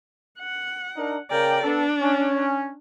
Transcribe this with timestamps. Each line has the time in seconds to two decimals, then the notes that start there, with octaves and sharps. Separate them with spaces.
0.39 F#5
0.97 D4 D#4 A#4
1.30 C#3 A#4 D5 G5
1.64 B3 D4 A4
2.00 C#4